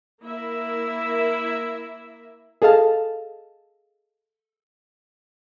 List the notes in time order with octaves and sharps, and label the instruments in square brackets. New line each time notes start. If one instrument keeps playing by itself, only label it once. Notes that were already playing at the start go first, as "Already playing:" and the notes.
[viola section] A#3 E4 A#4 E5
[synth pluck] G#4 A4 D#5 F5 A5